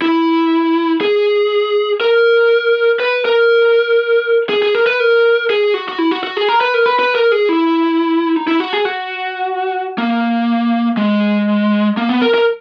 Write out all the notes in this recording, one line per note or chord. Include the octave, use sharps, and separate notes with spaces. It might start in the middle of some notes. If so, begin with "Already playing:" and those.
E4
G#4
A#4
B4
A#4
G#4
G#4
A#4
B4
A#4
G#4
F#4
F#4
E4
F#4
F#4
G#4
A#4
B4
A#4
B4
B4
A#4
G#4
E4
D#4
E4
F#4
G#4
F#4
A#3
G#3
A#3
B3
A#4
A#4